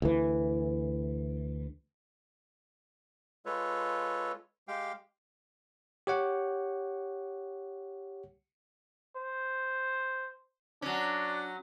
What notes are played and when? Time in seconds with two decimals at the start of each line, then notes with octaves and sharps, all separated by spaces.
0.02 D2 E3
3.45 G#3 F4 A4 B4 C#5
4.68 G#3 G4 F5 G5
6.07 G4 C#5 F#5
9.16 C5
10.82 F#3 C#4 D4